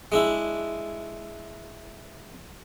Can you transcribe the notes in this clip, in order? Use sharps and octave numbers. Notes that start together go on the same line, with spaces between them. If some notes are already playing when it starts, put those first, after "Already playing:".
G#3 D4 E4